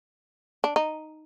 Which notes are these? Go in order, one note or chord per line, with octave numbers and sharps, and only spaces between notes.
D4
D#4